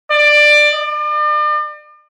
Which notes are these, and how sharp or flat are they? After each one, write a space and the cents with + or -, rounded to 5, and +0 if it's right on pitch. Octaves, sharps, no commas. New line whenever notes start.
D5 +15
D5 +40